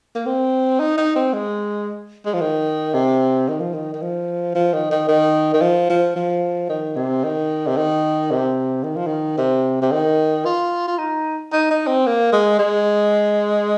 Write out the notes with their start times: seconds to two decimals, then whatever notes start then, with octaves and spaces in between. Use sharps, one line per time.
0.15 A#3
0.26 C4
0.80 D#4
0.97 D#4
1.16 C4
1.33 G#3
2.26 G#3
2.34 F3
2.41 D#3
2.94 C3
3.48 D#3
3.60 F3
3.74 D#3
3.94 D#3
4.02 F3
4.55 F3
4.74 D#3
4.91 D#3
5.08 D#3
5.54 D#3
5.62 F3
5.90 F3
6.16 F3
6.69 D#3
6.96 C3
7.24 D#3
7.67 C3
7.77 D#3
8.31 C3
8.83 D#3
8.96 F3
9.07 D#3
9.38 C3
9.82 C3
9.92 D#3
10.45 F4
10.88 F4
10.98 D#4
11.52 D#4
11.71 D#4
11.87 C4
12.06 A#3
12.33 G#3
12.59 G#3